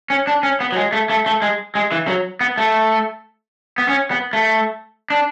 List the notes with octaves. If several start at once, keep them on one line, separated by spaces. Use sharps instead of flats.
C#4
D4
C#4
B3
F#3
G#3
A3
A3
A3
G#3
G#3
E3
F#3
B3
A3
B3
C#4
B3
A3
D4